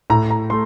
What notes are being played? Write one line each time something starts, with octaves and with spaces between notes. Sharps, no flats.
A2 A#5
A#5
A3 C6